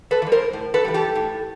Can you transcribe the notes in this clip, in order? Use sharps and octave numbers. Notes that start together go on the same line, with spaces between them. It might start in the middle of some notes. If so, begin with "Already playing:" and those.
A4 B4
E3
G3
A#4 C5
A2
A4 B4
E3 G3
G4 A4
A2